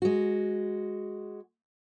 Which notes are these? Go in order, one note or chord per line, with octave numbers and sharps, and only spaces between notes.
G#3 F#4